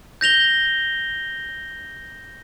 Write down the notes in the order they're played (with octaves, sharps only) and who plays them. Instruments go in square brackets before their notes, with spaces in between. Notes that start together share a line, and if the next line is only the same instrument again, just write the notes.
[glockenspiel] G6 A#6 F7 G7